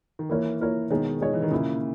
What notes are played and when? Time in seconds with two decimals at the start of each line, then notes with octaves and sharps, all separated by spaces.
0.19 D#3
0.29 E3 A#3 E4 A#4 C#5
0.60 A#3 E4 A#4 C#5
0.90 B2 D#3 G#3 D#4 G#4 C#5
1.21 B2 G#3 D#4 G#4 C#5
1.33 E3
1.42 D#3
1.51 A#2 C#3 A#3 E4